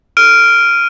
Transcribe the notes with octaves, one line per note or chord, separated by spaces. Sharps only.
F6 D7 D#7